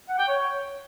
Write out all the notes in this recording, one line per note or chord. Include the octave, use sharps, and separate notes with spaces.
F#5
G5
C#5